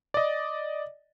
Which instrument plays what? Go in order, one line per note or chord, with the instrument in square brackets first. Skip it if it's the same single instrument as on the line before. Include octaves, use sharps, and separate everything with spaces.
[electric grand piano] D5 D#5